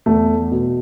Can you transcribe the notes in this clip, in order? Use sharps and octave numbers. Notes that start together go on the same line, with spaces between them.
E2 A3
B2